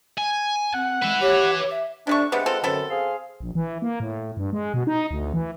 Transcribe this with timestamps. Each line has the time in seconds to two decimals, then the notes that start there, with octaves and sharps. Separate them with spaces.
0.18 G#5
0.74 C4 F#5
1.02 G#3 B4 E5
1.20 G4 C#5 D6
1.70 E5
2.07 C3 A3 D4 C#6
2.32 C3 G3 G#3 B3 B4 F#5
2.46 C4 F4 A4
2.64 F#2 D3 B3 C4 A4
2.90 G#4 C5 F5
3.40 A#1
3.55 E3
3.82 A#3
4.00 A2
4.37 G2
4.53 G#3
4.74 B2
4.87 D#4
5.11 D2
5.34 E3